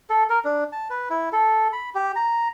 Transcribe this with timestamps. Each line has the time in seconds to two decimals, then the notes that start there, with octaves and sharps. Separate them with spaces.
0.10 A4
0.30 A#4
0.45 D4
0.72 A5
0.90 B4
1.10 E4
1.33 A4
1.73 B5
1.95 G4
2.16 A#5